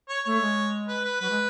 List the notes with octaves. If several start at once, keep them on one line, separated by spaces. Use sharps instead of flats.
C#5
A3 C#5
G#3
B4
B4
F#3 B4
G#3